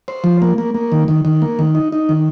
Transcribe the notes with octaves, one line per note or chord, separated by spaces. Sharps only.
C5
F3
A#3
A#3
A#3
D#3
D#3
D#3
A#3
D#3
D#4
D#4
D#3